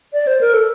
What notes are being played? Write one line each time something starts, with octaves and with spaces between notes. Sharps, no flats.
D5
C5
A#4
A4